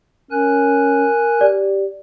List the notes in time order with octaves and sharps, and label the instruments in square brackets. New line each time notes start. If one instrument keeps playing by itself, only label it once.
[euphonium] C#4 [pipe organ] A#4 G#5 F#6
[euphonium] G4 [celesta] D5